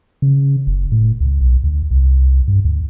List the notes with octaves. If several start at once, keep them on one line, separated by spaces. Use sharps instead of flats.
C#3
F#1
A2
C#2
B1
D2
C2
G2
D2